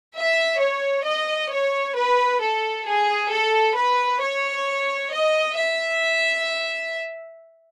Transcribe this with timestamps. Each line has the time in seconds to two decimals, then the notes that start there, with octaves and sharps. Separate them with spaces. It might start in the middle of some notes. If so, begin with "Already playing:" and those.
0.15 E5
0.59 C#5
1.04 D#5
1.50 C#5
1.95 B4
2.39 A4
2.86 G#4
3.30 A4
3.75 B4
4.20 C#5
5.11 D#5
5.56 E5